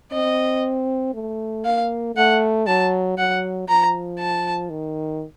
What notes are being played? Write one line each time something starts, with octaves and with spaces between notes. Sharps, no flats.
C4 D#5
A3
A#3 F5
A3 F#5
F#3 A5
F#3 F#5
F3 A#5
A5
D#3